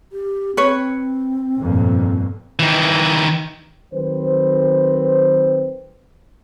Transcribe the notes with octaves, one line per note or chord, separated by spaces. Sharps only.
G4
C4 B4 C#5
G1 F2 A#2
D#3 E3
D#3 F#3 C4 B4 C5